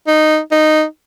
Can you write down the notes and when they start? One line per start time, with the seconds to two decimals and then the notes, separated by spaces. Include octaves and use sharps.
0.07 D#4
0.52 D#4